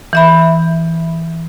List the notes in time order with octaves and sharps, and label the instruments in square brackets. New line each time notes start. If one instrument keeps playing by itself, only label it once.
[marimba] E3 E5 B5